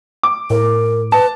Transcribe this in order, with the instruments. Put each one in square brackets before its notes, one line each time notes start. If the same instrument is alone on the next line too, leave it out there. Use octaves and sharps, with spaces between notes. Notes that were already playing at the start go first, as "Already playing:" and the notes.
[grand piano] D6
[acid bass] A2 [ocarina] A#4
[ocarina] B4 [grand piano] A5